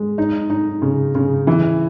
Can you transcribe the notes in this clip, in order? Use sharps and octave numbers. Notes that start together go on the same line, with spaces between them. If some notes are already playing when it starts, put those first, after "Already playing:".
Already playing: G#3
D#4
D#4
C#3
C#3
E3